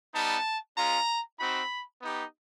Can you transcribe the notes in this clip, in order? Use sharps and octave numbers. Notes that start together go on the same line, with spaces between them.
G3 B3 D#4 A5
G#3 C#4 F4 A#5
C4 D#4 F#4 B5
B3 D#4 G4